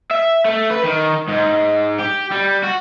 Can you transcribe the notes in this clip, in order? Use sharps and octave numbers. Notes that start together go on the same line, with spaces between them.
E5
A3
B4
D#3
G#2
G4
G3
F#4